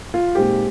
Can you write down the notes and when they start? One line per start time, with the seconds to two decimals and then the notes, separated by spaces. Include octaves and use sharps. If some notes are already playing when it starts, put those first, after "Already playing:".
0.14 F4
0.35 A#2 G#3 C4 D#4 G4